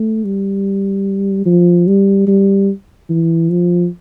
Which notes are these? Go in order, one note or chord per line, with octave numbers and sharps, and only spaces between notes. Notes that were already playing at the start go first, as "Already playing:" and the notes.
Already playing: A3
G3
F3
G3
G3
E3
F3